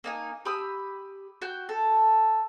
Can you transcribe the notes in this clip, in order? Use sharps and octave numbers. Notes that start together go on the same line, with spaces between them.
A#3 D#4 G#5
G4 B5 D#6 E6
F#4 G5 G6
A4